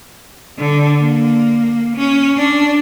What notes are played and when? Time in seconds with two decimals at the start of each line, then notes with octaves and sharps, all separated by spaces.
0.59 D3
0.99 A#3
1.97 C#4
2.38 D4